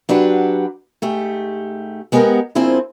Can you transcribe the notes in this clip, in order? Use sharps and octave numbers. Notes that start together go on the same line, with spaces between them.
F#3 D4 G4 B4 F#5
G#2 A3 G4
G#3 B3 G4 G#4 A#4 F#5
F3 A#3 C4 D4 E4 G#4